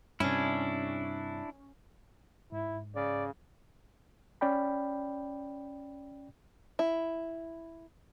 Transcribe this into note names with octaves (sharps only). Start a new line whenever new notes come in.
G2 C3 C#4 D4 E4
G#2 E4
C#3 D5
C#4 D5 G5 B5
E4